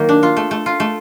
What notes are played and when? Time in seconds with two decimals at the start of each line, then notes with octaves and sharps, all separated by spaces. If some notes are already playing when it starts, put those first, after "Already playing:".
Already playing: D#3 F#3 A#3
0.09 D4
0.23 F4
0.37 A3
0.51 A3
0.66 F4
0.80 A3